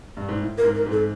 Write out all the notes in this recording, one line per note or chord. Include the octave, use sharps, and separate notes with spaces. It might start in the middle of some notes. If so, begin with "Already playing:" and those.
G2
G#2
A2
A#4
G#2
A#4
G#2
A4